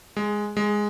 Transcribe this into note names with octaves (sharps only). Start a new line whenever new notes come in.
G#3
G#3